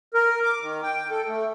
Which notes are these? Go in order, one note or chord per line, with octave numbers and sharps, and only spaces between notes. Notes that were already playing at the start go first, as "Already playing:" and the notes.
A#4
D6
D#3
G5
A4
A3